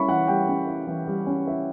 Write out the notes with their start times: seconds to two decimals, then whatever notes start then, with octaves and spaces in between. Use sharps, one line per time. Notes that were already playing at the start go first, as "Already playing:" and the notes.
Already playing: G3 C#4 E4 B5 C#6
0.08 E3 F#5
0.27 G3 G5
0.48 C#4
0.67 E4
0.87 E3
1.07 G3
1.27 C#4
1.47 E4